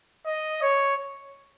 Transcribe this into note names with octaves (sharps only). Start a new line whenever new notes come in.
D#5
C#5